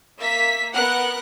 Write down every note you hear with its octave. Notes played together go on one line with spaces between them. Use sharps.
A#3 E5 B6
B3 A#4 F#5 F#6